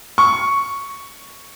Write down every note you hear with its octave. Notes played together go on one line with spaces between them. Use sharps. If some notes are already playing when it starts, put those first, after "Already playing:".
C#6